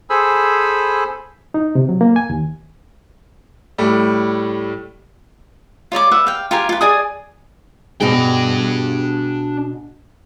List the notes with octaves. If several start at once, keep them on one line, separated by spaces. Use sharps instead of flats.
G#4 A4 C5 G#5 B5 E6
D#4
C3
F#3
A#3
G#5
D#2
A2 G3 A3
F4 C#5 D5 D6
B4 E5 F#5
F5 G5
F4 G4 A#4 G#5
F4 B4
G#4 D5 G#5 D#6
B2 D4 F#4 G#4 G5